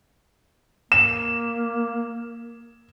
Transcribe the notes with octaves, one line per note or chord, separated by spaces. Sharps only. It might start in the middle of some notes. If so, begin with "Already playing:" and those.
A#3 E7